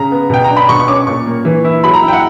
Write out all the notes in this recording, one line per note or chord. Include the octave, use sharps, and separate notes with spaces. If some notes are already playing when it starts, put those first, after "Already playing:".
Already playing: C#3 A#5
B3
B2 G5
A#5
D4
B5
B2 C#6
C#6
C#4 D6
A#2 C#6
A#3
E3
E4
F#3 B5
A#5
E4
G5
F#5